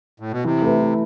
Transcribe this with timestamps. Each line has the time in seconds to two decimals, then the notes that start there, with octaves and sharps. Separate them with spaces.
0.20 A2
0.32 B2
0.44 C3 E3
0.62 A3 E4 B4
0.80 E3